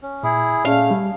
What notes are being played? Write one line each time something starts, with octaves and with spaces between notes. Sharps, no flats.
C#4
A#2 E4 G#4
A#2 A3 C#4 G#4 F5
G3